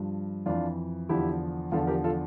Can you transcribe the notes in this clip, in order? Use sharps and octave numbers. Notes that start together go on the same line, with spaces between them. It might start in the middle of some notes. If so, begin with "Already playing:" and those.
Already playing: G2 F3
F2 E3 D4 F4
E2 D3 F3 E4 G4
E2 D3 F3 F4 A4
G4 A#4
F4 A4